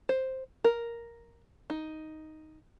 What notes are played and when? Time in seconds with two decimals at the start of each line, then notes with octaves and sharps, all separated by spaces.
0.09 C5
0.64 A#4
1.70 D#4